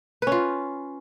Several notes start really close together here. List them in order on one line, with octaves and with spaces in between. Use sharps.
B4 C#4 F4